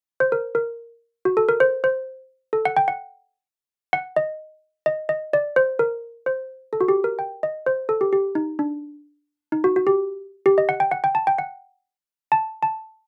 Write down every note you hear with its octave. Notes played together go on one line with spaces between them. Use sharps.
C5
A#4
A#4
F#4
A4
A#4
C5
C5
A4
F#5
G5
F#5
F#5
D#5
D#5
D#5
D5
C5
A#4
C5
A4
F#4
G4
A#4
G5
D#5
C5
A4
G4
G4
D#4
D4
D#4
F#4
F#4
G4
G4
D#5
F#5
G5
F#5
G5
A5
G5
F#5
A5
A5